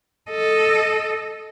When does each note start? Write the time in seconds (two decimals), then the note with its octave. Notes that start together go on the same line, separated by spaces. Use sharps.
0.30 A4 D#5